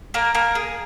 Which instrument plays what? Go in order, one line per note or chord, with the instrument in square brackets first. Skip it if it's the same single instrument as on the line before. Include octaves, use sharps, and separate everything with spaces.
[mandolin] A#3 A#4
A#3 A#4
G#4